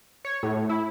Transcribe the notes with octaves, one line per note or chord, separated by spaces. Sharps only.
C#5
A2
E4